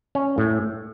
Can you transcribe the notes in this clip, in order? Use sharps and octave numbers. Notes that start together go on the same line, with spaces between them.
C#4
A2